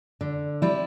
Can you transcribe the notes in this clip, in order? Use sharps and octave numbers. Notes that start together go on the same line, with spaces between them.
D3
G3 C4 E4